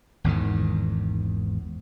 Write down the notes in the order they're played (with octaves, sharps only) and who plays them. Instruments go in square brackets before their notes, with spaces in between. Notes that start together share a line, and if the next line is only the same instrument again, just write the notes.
[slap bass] G#1 E2 G#2 D#3